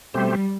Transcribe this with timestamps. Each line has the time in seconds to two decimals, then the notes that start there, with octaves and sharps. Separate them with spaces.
0.14 B2 G3 A3 C4 G4 C5